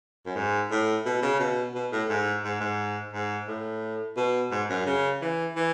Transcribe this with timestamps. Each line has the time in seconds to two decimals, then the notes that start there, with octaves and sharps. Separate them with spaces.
0.26 F#2
0.36 G#2
0.71 A2
1.05 B2
1.22 C#3
1.39 B2
1.75 B2
1.92 A2
2.09 G#2
2.44 G#2
2.61 G#2
3.13 G#2
3.48 A2
4.17 B2
4.51 G#2
4.69 F#2
4.86 C#3
5.22 E3
5.56 E3